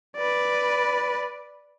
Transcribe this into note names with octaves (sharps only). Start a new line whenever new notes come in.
B4 D5